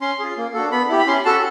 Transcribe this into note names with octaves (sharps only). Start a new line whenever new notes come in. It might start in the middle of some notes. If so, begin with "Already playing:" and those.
C#4 C6
F4 G#4
A#3
D4 F#4 A4
B3 B5
E4 G4
B5
C#4 C6
F#4 A4 A5